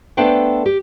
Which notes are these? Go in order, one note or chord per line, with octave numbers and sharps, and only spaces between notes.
A3 B3 D4 A4 C5 G5
G4